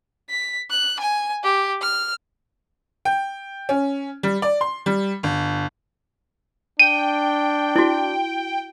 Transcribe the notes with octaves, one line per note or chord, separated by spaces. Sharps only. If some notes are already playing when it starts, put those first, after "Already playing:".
B6
F#6
G#5
G4
F6
G5
C#4
G3
D5
C6
G3
G1
D4 G5 D#7
E4 F#4